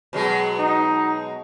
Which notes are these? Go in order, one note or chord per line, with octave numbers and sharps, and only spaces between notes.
B2 F#3 G#3
D#4